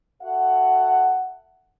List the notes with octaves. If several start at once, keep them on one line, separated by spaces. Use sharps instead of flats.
F#4 A4 E5 F#5